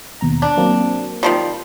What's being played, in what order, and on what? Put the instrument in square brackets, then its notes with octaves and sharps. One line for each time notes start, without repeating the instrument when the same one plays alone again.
[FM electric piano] D#2 B2 A#5
[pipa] D4
[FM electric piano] F#3 A#3 C4
[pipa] D#3 F3 G3